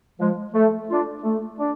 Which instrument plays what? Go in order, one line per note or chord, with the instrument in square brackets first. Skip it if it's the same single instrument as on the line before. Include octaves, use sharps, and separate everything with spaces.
[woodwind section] F3 G#3
A3
D4 F4
A3
D4